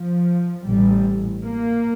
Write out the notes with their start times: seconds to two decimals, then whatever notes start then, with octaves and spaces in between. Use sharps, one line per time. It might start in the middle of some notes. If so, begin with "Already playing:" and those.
Already playing: F3
0.67 A1 A2 G3
1.44 A#3